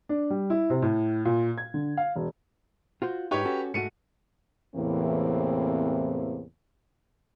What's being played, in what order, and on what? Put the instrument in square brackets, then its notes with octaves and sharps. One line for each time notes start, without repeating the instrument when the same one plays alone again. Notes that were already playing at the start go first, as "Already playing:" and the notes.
[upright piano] D4
G3
E4
C3
A2
A#2
G#6
D3
F5
E1
[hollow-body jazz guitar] F4 F#4 C5
[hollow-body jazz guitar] G#2 D#4 [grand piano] G4 B4 C#5
[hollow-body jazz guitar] C#4 F#4 A4
[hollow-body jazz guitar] G#2 A3 F#4 [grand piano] C#7 D#7
[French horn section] E2 A2 C3 E3 A#3 C4